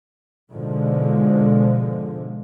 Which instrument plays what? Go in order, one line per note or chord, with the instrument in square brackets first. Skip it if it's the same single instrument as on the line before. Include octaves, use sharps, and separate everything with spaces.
[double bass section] G#2 B2 D3 F3 G#3